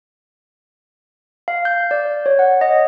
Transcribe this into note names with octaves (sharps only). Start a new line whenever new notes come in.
F5
G6
D5
C#5
F#5
D#5